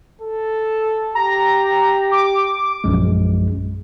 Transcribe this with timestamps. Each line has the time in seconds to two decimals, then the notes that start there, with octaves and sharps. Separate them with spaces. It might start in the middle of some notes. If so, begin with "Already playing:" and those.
0.22 A4
1.15 G4 A#5
2.11 D6
2.84 A#1 F#2 G#3